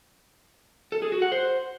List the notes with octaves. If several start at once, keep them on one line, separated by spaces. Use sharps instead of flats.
A4
G#4
F#4
F#5
C5